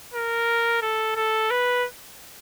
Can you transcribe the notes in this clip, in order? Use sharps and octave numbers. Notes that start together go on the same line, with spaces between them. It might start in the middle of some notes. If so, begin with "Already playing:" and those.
A#4
A4
A4
B4